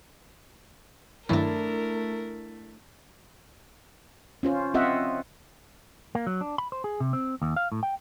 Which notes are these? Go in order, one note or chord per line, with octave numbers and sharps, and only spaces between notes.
G2 D#3 F#3 A3 D4 E4 A#4
C#4 F4 C5
C4 F4 D#5 E5 F#5
A#3
F#3
D4
B5
C5
G#4
C3
C4
D#2
F5
A2
G5